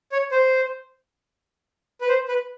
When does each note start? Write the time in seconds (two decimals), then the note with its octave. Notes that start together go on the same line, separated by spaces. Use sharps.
0.12 C#5
0.31 C5
2.01 B4
2.08 C5
2.28 B4